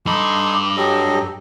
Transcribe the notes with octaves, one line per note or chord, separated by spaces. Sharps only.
G2 D#4 A4 B5 C6 D6
F#3 G4 A4 D#5